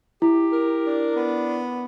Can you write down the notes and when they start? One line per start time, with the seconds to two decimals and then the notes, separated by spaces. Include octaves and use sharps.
0.22 E4 G4
0.53 A#4
0.85 D4
1.16 B3